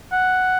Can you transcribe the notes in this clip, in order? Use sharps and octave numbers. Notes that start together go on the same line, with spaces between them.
F#5